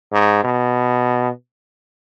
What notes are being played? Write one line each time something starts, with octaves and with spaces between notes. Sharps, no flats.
G#2
B2